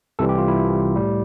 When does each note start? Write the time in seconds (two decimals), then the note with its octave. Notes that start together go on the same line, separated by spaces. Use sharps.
0.19 C2 C3 E3 G3 A4
0.29 G4
0.38 F4
0.48 E4
0.96 A2 G3